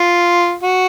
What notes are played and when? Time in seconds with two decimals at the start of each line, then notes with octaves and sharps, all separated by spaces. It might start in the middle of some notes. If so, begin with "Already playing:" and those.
Already playing: F4
0.63 F#4